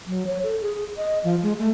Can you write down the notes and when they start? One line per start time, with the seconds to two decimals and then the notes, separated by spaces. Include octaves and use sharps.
0.07 F#3
0.27 C#5
0.43 A4
0.61 G#4
0.97 D#5
1.24 F3
1.43 G#3
1.59 A3